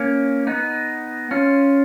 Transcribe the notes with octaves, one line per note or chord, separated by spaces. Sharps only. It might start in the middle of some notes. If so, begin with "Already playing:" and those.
Already playing: A#3 C#4
B3 D#4
C#4 F4